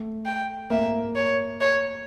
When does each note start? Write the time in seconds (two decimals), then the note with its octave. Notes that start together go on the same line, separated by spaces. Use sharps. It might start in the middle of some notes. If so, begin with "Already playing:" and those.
Already playing: A3
0.26 G5
0.70 A#3 E5
1.16 C#5
1.61 C#5